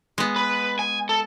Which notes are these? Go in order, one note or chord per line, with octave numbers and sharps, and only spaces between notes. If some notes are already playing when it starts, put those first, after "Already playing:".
G#3 B3
B4
G#5
A4